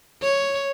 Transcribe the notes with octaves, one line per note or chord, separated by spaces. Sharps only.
C#5